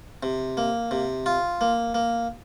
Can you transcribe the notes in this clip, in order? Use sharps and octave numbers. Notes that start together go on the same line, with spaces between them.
C3
A#3
C3
F4
A#3
A#3